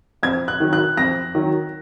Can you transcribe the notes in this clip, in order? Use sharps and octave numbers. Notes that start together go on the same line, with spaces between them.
F2 G#6
F#6
D#3 F#3
F#6
F2 A#6
D#3 F#3